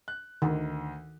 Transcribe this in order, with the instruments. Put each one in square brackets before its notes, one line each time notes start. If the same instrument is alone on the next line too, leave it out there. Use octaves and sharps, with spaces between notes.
[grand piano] F#6
[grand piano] D2 [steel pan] D#3